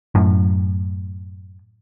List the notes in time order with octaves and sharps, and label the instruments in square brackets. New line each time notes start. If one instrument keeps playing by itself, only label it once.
[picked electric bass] F#2 A2